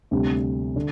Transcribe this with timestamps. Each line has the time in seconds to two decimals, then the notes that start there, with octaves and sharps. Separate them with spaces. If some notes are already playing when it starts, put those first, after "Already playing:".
0.11 D2 C3 G3
0.76 D3